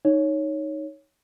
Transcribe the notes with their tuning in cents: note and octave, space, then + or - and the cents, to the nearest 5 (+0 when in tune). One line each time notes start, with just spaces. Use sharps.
D#4 +0 C#5 +0